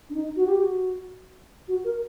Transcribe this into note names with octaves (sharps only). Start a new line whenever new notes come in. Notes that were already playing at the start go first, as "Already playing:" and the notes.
D4
D#4
F#4
G4
F#4
F#4
A#4